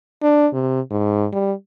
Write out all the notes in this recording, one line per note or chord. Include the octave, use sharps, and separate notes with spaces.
D4
C3
G#2
G3